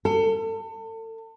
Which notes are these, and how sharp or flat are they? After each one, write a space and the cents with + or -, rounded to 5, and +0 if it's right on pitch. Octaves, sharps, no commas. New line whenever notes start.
A4 +35